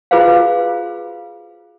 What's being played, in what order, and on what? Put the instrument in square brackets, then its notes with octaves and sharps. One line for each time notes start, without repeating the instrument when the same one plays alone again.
[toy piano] F4 F#4 G#4 B4 C5 F5